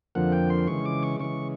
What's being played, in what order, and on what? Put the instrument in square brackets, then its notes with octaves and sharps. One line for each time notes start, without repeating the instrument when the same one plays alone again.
[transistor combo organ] F2 D3 F3 A#3 F#5
G5
C6
C#3 E3 G#3 C#6
D6
C#6
C#3 E3 G#3 C#6